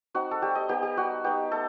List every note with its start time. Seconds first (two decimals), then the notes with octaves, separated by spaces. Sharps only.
0.14 C4 D#4 F#4
0.31 A4
0.42 G3 G4
0.55 D#5
0.69 B3 D#4 G4
0.83 G4
0.97 G3 F#4
1.24 B3 D#4 G4
1.52 A3 A4